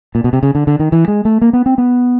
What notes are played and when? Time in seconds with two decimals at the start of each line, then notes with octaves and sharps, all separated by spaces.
0.15 A#2
0.24 B2
0.33 C3
0.43 C#3
0.55 D3
0.67 D3
0.79 D#3
0.92 E3
1.08 G#3
1.25 A3
1.42 A#3
1.53 B3
1.66 C4
1.78 B3